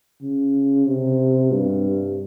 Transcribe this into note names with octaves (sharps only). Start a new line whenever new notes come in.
C#3
C3
G2